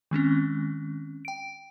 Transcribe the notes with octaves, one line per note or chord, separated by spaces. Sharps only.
D#3 G#3 C4 C#4
G5 D7